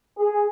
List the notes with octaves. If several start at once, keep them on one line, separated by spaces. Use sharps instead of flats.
G#4